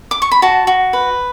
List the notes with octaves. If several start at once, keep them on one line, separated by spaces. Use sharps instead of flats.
D6
C#6
B5
F#4 A5
F#4
B4